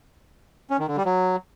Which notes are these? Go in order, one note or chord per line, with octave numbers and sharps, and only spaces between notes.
C#4
D#3
D3
G3
F#3